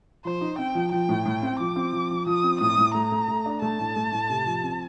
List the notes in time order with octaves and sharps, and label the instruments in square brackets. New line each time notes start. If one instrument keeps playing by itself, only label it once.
[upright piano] F3 [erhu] C5
[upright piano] D#4
[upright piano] C4 [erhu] G5
[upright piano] F3
[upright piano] F3 [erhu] G5
[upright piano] A2
A2
C4
[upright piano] F3 [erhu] D6
[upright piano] C4
F3
F3
[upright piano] F3 [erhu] D#6
[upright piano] C4
[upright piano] A2 [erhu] D#6
[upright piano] A2
[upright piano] A3 [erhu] A#5
[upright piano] A3
A3
D4
[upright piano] A3 [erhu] A5
[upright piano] A2
A3
A2
C3
F3
C4